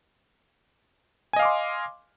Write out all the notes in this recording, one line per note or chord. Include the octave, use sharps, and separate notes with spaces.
D#5 F5 G#5 C6 D6